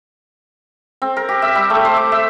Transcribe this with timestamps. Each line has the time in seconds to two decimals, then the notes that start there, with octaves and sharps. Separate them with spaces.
1.02 C4
1.17 A#4
1.29 G4
1.42 E5
1.55 G3
1.70 A3
1.85 C5
1.97 D6
2.12 E5